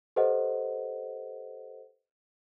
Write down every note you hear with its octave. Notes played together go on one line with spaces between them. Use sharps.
G4 A4 B4 C5 D#5 F#5